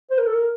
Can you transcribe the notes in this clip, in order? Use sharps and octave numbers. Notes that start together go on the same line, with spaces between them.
C5
A#4
A4
A#4